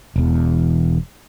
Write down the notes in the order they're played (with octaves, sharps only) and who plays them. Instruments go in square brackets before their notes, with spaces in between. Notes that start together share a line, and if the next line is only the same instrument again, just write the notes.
[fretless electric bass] E1 E2